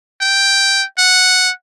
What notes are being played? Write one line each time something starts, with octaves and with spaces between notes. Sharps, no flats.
G5
F#5